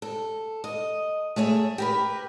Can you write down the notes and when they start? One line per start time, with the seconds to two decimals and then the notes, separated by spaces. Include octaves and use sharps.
0.02 A4
0.64 D#5
1.36 A3 G#4 C#5 E5
1.78 G4 A#4 B4